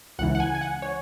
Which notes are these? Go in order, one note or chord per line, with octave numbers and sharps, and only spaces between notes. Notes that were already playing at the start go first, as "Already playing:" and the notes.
C#2 C#3 E3 F#5
F#5
G#5
G#5
F#5
C#5